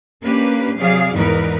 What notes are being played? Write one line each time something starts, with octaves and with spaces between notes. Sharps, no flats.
A#3 C#4 D4 G4 B4
C3 F#3 G#4 D5 F5
E2 G#2 E3 D#4 A#4 B4